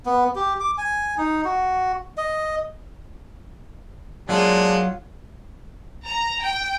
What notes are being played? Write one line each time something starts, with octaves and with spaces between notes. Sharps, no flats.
B3
G4
D6
G#5
D#4
F#4
D#5
F#3 G#3 A#3 D4 F4
A#5
G5